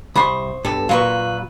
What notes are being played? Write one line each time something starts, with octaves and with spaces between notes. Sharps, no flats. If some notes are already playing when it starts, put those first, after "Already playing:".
C2 C5 B5 C#6 D#6
B1 G2 A4
A#2 F#3 F4 B4 C#6